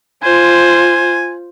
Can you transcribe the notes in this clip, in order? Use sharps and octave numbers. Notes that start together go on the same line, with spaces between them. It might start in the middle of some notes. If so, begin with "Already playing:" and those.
F4 C5 G#5